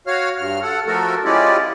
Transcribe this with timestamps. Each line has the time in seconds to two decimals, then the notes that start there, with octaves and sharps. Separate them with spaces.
0.07 F#4 C#5 F5 F6
0.38 G2 F6
0.62 A4 F#5
0.87 F3 A3 F#4 A4 A#4
1.25 G#3 C#4 E4 F4 G4 D5